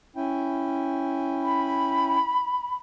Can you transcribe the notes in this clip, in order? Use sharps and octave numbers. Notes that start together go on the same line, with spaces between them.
C#4 E4 G5
B5